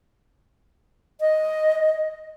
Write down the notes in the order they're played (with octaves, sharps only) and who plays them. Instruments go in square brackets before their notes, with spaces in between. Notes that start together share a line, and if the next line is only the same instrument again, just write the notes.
[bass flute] D#5